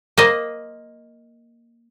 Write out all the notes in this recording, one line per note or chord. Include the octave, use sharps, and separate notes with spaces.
A#3 C5 D#5